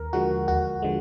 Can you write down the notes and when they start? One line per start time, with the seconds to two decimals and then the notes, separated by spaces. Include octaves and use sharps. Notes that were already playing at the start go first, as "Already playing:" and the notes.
Already playing: D#2 A#4
0.13 D3 F3 G#3 F#4
0.48 D#2 F#4
0.82 D3 F3 G#3